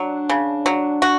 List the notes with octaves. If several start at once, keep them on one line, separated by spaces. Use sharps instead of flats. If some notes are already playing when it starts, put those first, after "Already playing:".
Already playing: F#3 D4
C#3
F#3
F#4